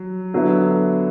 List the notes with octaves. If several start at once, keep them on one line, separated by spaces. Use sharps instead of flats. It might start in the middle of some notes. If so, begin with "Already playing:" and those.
Already playing: F#3
D3 F#3 B3 E4